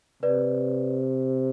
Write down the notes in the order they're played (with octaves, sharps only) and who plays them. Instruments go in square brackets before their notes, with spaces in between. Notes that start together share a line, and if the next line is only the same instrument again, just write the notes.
[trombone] C3 [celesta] B4 D5